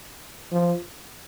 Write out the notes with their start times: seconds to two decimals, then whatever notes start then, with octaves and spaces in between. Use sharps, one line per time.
0.52 F3